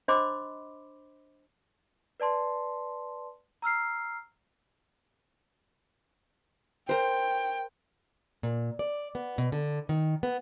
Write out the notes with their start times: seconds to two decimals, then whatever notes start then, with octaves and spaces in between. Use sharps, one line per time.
0.08 D4 C5 D#5 B5 C6 D6
2.20 B4 D5 A5 C6
3.62 A#5 E6 F6 C7
6.89 A#4 C5 G5
8.43 A#2
8.79 D5
9.15 B3
9.38 B2
9.52 D3
9.89 D#3
10.23 B3